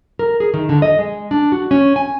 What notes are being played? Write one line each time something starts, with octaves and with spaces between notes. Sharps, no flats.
A#4
G#4
D#3
D3
D#5
G#3
D4
F#4
C#4
G#5